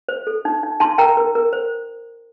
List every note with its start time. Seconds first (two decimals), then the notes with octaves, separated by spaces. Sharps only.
0.09 C5
0.27 A4
0.45 D#4
0.63 D#4
0.80 D#4 A5 C6
0.98 A#4 G5 A#5
1.17 A#4
1.35 A#4
1.53 C5